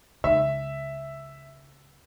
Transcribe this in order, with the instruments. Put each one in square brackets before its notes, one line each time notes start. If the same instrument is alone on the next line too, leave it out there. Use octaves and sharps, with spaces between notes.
[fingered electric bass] C#2 [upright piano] E5